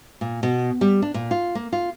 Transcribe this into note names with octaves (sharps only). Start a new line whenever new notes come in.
A#2
B2
G3
D4
A#2
F4
A#3
F4